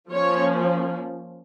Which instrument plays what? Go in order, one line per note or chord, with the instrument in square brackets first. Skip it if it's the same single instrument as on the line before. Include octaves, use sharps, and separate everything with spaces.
[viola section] F3 A#3 C#4 C#5